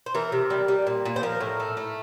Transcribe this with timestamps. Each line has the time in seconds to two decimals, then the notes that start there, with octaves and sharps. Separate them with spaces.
0.06 C5
0.15 E3 A#4
0.32 C3
0.50 G3
0.68 G3
0.87 A#2
1.05 A#2
1.16 C5
1.23 F3 A#4
1.40 A2
1.60 A3
1.77 A3